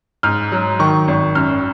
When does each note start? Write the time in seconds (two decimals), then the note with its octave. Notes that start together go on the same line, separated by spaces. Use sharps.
0.23 G#2 F6
0.52 F#3
0.79 D#3 C#6
1.08 G#1
1.35 F#2 F6